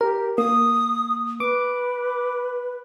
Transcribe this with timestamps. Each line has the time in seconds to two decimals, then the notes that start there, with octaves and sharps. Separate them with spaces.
0.01 G4 A#4
0.38 A#3 D#6
1.40 B4 D6